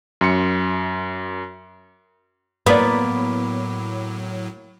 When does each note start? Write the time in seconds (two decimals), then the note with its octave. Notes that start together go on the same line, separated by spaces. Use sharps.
0.21 F#2 C6 C#7
2.66 A2 F#3 A#3 B3 D5 B5 D6